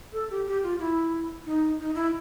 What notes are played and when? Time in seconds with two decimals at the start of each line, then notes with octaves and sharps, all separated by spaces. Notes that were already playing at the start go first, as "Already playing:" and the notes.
0.13 A4
0.30 G4
0.47 G4
0.63 F4
0.79 E4
1.46 D#4
1.79 D#4
1.95 E4